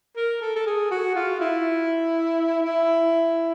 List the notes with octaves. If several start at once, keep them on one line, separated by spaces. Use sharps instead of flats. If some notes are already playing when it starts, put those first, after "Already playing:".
A#4
A4
A4
G#4
F#4
F4
E4
E4